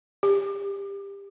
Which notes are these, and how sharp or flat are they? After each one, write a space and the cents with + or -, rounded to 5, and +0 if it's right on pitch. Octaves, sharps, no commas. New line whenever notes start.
G4 +20